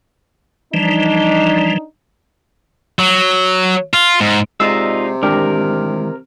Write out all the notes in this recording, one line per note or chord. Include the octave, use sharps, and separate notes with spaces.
E3 F3 G3 D4 D#4
F#3
F4
G#2
C3 G#3 D#4 F4 D5 F5 E6
D#3 E3 G#3 D4 G4 A#4